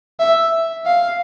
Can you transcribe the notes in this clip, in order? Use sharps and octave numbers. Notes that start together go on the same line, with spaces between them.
E5
F5